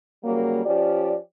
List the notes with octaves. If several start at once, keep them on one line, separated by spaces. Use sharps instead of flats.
C#3 F#3 G3 A#3
F3 C#4 G4 D5